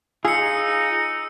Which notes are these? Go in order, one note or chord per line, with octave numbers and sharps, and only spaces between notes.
D#4 F4 G#4 E6 C#7